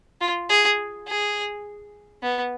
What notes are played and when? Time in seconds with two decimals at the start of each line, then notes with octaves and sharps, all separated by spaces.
0.21 F4
0.50 G#4
1.07 G#4
2.22 B3